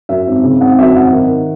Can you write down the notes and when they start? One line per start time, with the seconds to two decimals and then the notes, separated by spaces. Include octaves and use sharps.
0.09 F#2 E5
0.27 G#1
0.44 C#3
0.61 G#1 F#5
0.79 F#2 E5
0.96 G#1 F#5
1.13 D#3